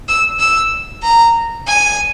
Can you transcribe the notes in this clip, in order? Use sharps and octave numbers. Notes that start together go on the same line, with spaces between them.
E6
E6
A#5
G#5